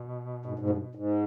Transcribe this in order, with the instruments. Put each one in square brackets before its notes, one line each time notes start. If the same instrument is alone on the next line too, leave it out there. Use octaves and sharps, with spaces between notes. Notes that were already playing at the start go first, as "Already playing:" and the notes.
Already playing: [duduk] B2
[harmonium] G#2
G#2
G2
G#2